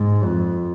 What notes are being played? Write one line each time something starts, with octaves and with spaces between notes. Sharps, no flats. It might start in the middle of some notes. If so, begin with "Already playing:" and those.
Already playing: G#2
F2